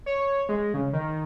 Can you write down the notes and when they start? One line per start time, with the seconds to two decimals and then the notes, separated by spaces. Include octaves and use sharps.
0.06 C#5
0.49 G#3
0.74 C#3
0.93 D#3